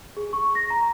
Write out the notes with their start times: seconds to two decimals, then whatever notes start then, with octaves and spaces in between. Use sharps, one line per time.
0.17 G#4
0.33 C#6
0.55 A#6
0.70 A#5